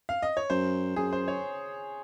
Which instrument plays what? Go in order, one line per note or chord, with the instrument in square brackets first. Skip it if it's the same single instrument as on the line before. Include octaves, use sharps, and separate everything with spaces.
[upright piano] F5
D#5
C#5
[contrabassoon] F#2 [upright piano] C5
[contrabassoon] F#2 [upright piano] G#4
[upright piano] C5
C#5